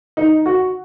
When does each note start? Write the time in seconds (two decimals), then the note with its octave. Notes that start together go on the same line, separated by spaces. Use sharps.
0.17 D#4
0.46 F#4